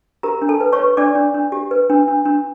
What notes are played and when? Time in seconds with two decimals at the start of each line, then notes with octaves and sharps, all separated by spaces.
0.23 G4 A#4 A#5
0.42 D4
0.49 A4 A5
0.60 B4
0.73 C#5 C#6
0.79 B4
0.97 D4 D5 D6
1.15 D4
1.34 D4
1.52 G4
1.71 B4
1.90 D4
2.08 D4
2.25 D4